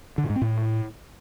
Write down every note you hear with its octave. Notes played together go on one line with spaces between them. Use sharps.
D3
A2
G#2
C4
A2